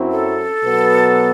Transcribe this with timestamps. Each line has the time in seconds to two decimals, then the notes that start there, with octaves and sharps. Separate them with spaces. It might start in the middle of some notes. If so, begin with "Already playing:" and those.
Already playing: F#2 F#3 C4 E4
0.12 A4
0.63 B2 F#3 B3